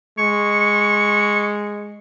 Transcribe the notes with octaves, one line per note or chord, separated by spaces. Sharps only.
G#3 C#6